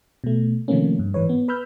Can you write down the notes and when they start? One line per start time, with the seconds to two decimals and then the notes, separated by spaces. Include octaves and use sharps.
0.24 B2 A3
0.68 C3 D#3 F3 A3 A#3 C#4
0.99 G2
1.14 G#2 E3 B4 C#5
1.29 B3
1.48 B4 B5 E6 F6 G6